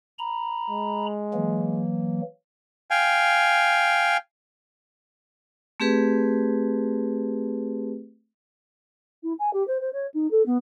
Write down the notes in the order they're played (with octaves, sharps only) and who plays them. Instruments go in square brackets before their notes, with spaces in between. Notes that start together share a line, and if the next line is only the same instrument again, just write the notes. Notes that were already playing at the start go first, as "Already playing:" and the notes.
[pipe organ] A#5 B5
[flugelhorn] G#3
[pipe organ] E3 F#3 A#3
[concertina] F5 G5 G#5
[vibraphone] A3 C4 G4 G#4 B4
[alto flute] E4
G#5
G4
C5
C5
C#5
D#4
A4
B3